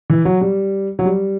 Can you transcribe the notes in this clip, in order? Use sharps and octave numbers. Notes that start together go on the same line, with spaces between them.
E3
F#3
G3
F#3
G3